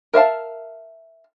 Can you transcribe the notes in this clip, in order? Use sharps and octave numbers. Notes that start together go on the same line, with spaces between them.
A#4 E5 F5 A5